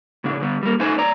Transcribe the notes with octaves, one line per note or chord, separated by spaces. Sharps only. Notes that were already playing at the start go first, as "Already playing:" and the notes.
A2 C#3 D4
D3 G3 B3
G3 A#3
A3 D#4 B4 C5 G#5
C#5 D5 A#5